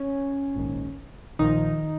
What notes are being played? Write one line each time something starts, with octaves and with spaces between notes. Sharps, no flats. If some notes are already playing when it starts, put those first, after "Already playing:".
Already playing: C#4
A#1 G#2 D#3
A#1 A#2 D#3 F3 D#4